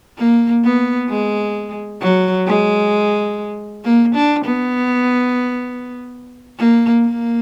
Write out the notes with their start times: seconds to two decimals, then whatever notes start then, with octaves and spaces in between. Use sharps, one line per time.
0.18 A#3
0.64 B3
1.09 G#3
2.01 F#3
2.47 G#3
3.84 A#3
4.15 D4
4.45 B3
6.58 A#3
7.04 A#3